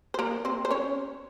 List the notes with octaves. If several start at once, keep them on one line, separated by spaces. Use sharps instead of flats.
C5
A#3 A#4
C4 C5
C5
C#4 C#5